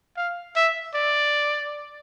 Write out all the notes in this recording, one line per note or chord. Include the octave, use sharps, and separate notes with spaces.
F5
E5
D5